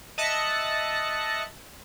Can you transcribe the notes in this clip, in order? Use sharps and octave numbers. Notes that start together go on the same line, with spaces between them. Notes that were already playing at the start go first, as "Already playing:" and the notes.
D#5 E5 A5 F#6 A#6 C#7